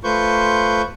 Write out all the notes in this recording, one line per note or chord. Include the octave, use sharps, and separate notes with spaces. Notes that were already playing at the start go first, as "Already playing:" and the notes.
A3 F4 B4 C5 C#6 G6